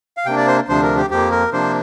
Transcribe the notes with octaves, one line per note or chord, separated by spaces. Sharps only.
F5
C3 A#3 D4 G5
D5
C5
D2 C3 F3 D4 C5
A#4
G4
F2 F3 A#3 G4
A#4
C3 F3 A#3 D4 C5